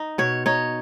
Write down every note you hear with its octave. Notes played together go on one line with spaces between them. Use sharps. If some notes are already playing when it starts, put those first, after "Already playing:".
Already playing: D#4
B2 C#5
D#4 C#5